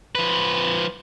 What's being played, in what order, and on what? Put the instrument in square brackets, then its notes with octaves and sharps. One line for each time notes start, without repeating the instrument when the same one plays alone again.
[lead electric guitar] F3 B4